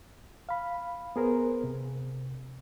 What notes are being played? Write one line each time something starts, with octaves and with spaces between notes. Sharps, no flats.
F5 B5
B3 G#4 A#4 C5
C3